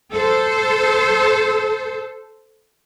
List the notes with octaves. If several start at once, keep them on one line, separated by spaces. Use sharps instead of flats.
A4 C5